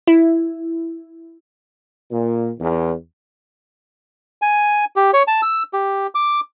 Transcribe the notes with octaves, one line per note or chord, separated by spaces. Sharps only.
E4
A#2
E2
G#5
G4
C#5
A5
E6
G4
D6